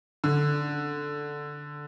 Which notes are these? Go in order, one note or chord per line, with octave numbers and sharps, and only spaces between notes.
D3